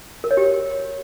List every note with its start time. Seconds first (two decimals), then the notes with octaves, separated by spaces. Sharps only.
0.24 A#4
0.31 C#5
0.37 G4